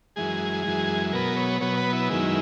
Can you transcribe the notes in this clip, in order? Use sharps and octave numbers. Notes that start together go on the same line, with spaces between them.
F#2 E3 G#3 G#4
F#2 E3 G#3
B2 F#3 B3 A#4
C#5
B2 F#3 B3 C#5
B4
E4
F#2 D#3 G#3